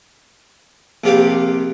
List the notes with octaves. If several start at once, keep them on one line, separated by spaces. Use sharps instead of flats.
A#1 C3 F4 G4 B4 D6